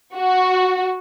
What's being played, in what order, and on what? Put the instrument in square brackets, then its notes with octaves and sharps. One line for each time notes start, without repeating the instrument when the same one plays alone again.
[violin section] F#4